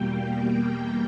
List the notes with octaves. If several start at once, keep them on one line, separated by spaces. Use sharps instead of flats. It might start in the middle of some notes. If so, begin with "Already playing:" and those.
Already playing: E2 B2 G3 A#3 G5